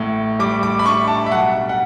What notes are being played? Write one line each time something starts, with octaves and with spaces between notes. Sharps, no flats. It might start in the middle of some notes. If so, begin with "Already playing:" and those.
Already playing: A1 A2
G3 D6
D6
B5
D4 C#6
A5
E5
B1 F#5
F#5